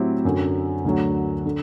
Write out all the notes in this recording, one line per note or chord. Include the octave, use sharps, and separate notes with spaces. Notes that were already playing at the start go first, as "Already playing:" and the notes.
Already playing: A2 F#3 C4 E4 G4
F#2 D3 F#3
D2 D3 F#3
D3